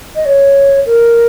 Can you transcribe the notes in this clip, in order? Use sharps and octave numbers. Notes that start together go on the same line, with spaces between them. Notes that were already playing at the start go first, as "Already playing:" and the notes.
D#5
C#5
A#4